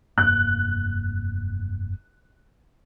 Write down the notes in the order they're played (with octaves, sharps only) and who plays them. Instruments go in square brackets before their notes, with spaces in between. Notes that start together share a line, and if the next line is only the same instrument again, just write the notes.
[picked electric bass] F1 G2 A#3 [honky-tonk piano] F#6